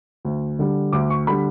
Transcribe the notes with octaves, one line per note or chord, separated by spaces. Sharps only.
D2
D3 G3
D2 D6
C#6
D3 G3 B5